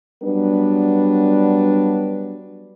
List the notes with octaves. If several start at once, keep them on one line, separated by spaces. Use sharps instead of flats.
F#3 G3 B3 D4 B4